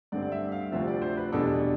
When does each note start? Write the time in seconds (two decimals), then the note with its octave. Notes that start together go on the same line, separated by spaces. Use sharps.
0.12 G2 D3 A3 C4 D5
0.22 D5
0.32 E5
0.52 F5
0.72 D2 C3 F3 C4 E5
0.87 D5
1.02 C5
1.17 B4
1.32 E2 B2 G3 D4 A4